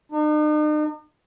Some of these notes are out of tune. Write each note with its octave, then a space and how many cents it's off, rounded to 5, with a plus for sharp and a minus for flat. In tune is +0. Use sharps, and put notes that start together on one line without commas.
D#4 -45